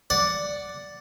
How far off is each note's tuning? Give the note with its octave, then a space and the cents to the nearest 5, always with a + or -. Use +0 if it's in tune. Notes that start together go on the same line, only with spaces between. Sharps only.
D5 +0 F#5 +0